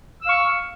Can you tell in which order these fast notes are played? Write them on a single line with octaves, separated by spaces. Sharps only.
E6 F5 C#6